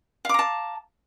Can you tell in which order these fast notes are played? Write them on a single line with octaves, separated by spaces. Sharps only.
F5 D6 A#5 A5